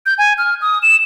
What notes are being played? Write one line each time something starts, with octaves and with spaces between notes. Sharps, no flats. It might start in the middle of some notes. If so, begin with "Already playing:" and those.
G6
G#5
F6
D#6
E7